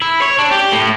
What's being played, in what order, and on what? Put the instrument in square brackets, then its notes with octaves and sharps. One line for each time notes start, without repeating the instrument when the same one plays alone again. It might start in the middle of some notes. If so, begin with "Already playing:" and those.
[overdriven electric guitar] E4
C#5
D4
G4
A2